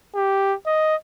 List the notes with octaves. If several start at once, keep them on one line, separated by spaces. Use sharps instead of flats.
G4
D#5